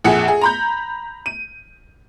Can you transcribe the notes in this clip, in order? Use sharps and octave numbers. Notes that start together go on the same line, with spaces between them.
A#1 F2 G#4 F#5 C#7
G#4
A#5 B5 G6
D#7